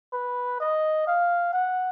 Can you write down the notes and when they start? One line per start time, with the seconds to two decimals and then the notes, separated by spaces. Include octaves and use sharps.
0.13 B4
0.60 D#5
1.07 F5
1.53 F#5